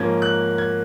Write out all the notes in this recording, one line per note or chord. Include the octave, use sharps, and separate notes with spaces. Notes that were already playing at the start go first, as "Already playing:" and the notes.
Already playing: G#2 F3 A#3 C#4 G#6
F#6
G#6